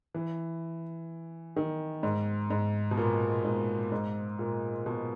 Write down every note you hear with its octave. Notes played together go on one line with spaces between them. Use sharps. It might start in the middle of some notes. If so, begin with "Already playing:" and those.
E3
D#3
G#2
G#2
B2
A#2
G#2
G#2
A#2
B2